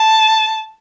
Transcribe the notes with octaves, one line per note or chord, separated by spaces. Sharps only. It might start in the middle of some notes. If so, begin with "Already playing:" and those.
Already playing: A5